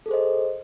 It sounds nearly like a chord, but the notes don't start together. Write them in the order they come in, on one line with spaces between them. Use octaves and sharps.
A4 G#4 C5 D#5